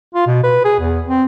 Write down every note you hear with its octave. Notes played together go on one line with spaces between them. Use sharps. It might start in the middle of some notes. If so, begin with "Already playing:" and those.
F4
B2
B4
G#4
E2
C4